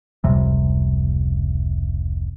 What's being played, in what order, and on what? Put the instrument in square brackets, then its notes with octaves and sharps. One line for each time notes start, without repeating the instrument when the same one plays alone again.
[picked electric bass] F1 C#2 C3 G3